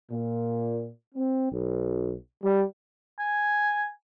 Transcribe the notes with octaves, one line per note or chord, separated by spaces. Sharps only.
A#2
C4
B1
G3
G#5